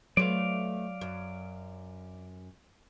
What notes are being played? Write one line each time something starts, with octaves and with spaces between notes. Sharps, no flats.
F#3 A3 B3 C4 D5 F5
F#2